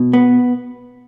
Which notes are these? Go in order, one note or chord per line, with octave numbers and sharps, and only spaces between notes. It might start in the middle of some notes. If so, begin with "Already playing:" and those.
Already playing: B2
B3